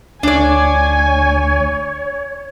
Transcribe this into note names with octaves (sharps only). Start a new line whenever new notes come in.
D2 D4 C#5 D5 G#5